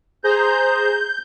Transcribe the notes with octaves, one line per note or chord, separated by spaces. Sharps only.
G#4 C5 A#5 G6